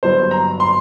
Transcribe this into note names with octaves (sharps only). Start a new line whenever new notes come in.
G1 G2 F#3 C5
A#5
C6